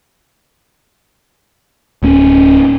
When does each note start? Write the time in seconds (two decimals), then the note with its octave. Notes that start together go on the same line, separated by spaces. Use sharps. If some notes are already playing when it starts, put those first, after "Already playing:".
2.03 D1 C#4